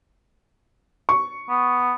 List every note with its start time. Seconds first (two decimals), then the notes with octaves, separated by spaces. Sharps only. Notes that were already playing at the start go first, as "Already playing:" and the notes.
1.09 C#6
1.49 B3